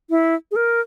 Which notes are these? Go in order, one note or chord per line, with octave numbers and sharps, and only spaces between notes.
E4
G#4
A#4